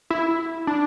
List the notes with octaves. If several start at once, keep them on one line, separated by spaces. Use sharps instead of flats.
E4
D4